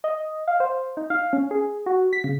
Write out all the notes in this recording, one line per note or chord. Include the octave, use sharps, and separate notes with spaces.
D#5
F5
C5
D#4
F5
C#4
G#4
F#4
B6
C#3